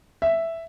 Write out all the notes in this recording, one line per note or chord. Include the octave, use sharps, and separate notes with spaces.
E5